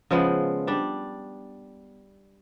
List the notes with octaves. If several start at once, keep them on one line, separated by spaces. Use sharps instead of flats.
C#3 F3 G#3 B3
G3 D4